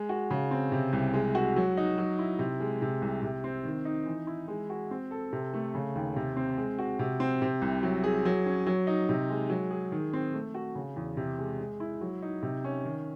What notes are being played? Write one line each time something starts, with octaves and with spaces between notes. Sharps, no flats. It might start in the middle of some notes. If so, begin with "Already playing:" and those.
Already playing: G#3
F#4
C#3
C4
C3
C2
G#3
F#4
F#3
D#4
F#3
E4
C3
G#3
C3
C2
C3
C4
D#3
D#4
E3
E4
G#3
F#4
C4
A4
C3
A3
C#3
D#2
C3
C4
G#3
F#4
C3
C4
C3
C2
F#3
G#4
F#3
C#4
F#3
D#4
C3
G#3
F#3
G#4
D#3
C4
A3
F#4
C#3
E2
C3
G#3
G#3
E4
F#3
D#4
C3
C#4
D#3